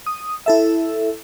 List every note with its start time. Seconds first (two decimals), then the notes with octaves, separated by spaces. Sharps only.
0.06 D#6
0.46 E4 A4 E5